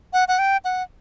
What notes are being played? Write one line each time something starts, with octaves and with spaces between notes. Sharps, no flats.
F#5
F#5
G5
F#5